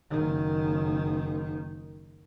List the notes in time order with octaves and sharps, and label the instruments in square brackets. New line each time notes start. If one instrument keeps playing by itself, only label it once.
[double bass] F#1 D#3